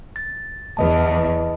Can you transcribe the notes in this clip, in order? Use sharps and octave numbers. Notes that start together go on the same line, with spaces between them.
A6
E2 B4 D#5 A5